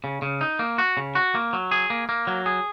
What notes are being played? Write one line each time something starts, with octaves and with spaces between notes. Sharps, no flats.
C#3
C#3
D#4
A#3
F#4
C#3
F#4
A#3
F#3
G#4
A#3
A#3
F#3
G#4